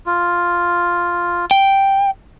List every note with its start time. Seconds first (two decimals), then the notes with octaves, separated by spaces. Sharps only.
0.06 F4
1.51 G5